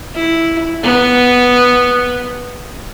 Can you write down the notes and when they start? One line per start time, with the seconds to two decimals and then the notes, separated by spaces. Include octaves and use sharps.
0.16 E4
0.83 B3